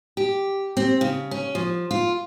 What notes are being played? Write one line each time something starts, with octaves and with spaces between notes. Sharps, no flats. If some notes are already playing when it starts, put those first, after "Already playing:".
G4
C4
C#3
C#4
F3
F4